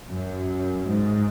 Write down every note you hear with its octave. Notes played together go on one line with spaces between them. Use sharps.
F#2
G#2